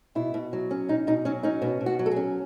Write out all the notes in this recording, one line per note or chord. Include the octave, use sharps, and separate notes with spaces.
B2 E4
B2
F#3
C#4
B2 D#4
B2 D#4
F#3 C#4
C#4 D#4
B2 F#4
B2
F#4
F#3
A4
G#4
C#4